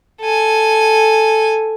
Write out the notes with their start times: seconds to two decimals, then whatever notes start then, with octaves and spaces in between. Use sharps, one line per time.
0.21 A4 G#5